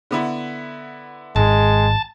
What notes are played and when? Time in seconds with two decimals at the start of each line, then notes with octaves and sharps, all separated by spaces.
0.11 D3 B3 E4
1.36 G#1 G#3 A5